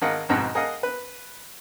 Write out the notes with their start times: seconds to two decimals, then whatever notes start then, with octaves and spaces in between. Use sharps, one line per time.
0.02 G#1 A#4 D#5 F5 F#5
0.29 G#1 F2 G#2 B2 F#5 A#5
0.55 G#4 A#4 D#5 F5 F#5 D#6
0.83 B4